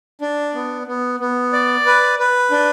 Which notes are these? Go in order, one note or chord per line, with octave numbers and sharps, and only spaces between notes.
D4
B3
B3
B3
D5
B4
B4
D4